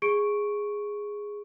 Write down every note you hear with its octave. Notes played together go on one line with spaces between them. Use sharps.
G#4 C#6 D7